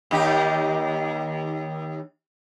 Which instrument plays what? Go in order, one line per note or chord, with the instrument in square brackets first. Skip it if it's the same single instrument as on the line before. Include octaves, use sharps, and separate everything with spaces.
[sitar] D#2 D#4 G4